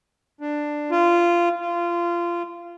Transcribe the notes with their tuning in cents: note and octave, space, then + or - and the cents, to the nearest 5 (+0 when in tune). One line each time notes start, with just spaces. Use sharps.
D4 +10
F4 -15
F4 -20